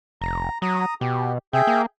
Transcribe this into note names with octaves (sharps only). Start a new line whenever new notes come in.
F1 A#5
F#3 A#5 D#6
B2 G4
C3 G#4 E5 G5
A#3